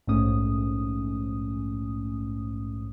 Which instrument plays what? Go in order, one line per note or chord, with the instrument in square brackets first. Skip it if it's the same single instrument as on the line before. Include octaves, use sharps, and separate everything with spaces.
[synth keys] A#1 G#2 A3 C#4 D#6